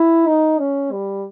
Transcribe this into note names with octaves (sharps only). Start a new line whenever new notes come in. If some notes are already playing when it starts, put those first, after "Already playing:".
Already playing: E4
D#4
C#4
G3